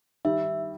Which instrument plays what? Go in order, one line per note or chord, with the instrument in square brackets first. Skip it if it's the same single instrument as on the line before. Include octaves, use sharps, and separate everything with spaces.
[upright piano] D#3 G3 [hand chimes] E5